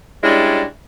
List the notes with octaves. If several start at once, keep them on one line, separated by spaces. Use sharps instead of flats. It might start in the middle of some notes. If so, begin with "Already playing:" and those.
G3 G#3 C#4 D4 E4